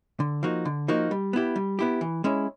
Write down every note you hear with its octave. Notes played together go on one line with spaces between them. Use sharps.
D3
F3 A#3 D#4 F#4
D3
F3 A#3 D#4 F#4
G3
B3 E4 G4
G3
B3 E4 G4
E3
G#3 C#4 E4